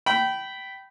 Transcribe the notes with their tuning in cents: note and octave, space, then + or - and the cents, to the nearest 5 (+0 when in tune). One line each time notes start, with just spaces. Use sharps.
G5 -20 B5 +0